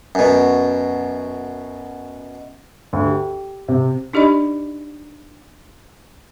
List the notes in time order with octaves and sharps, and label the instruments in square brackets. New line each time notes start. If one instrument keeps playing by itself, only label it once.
[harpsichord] F#2 B2
[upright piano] D2
G4
C3
[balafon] D4 D#4 G4 D5 D#5 B5